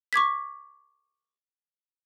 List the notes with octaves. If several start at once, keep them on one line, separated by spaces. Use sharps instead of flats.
C#6 D6 G#6 B6